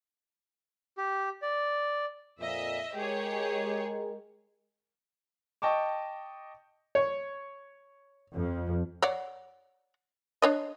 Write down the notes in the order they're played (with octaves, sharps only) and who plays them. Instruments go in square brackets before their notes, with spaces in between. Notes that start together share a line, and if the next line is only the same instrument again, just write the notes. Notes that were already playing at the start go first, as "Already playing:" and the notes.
[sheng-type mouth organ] G4
D5
[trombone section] F2 A#2 [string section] D#5 E5
[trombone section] G#3 A#4 [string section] G4 G#4 C#5
[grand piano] D#5 G5 A5 C#6 D6
[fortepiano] C#5
[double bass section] F2
[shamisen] C#5 D5 F#5
D4 C#5 D#5